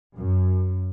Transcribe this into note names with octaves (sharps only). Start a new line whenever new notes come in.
F#2